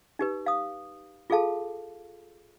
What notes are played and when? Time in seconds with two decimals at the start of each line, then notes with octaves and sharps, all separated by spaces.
0.19 D#4 G4 B4
0.46 F5 D#6
1.30 F4 G#4 A4 F5 A5